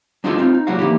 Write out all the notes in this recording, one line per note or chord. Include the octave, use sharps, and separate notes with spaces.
G3 D4 D#4 F4 F#4 A4
C4 D#4 F4
D#4
C#2 A#2 F#3 G3 F#4 F5
E3 A#3 D#4 G4